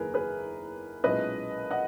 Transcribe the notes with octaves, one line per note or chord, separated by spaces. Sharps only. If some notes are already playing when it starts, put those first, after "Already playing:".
Already playing: F#1 E2 D#3 A#3 G#4 A#4 B4
G#4 B4
B1 A#2 G#3 C#4 E4 B4 D#5
D#5 F#5